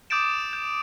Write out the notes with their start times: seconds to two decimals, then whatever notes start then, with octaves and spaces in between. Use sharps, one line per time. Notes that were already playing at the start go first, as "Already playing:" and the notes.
0.10 D6 D#6 G6 A6 D7 E7
0.53 G6